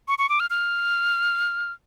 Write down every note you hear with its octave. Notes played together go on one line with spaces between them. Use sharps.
C#6
C#6
D6
F6
F6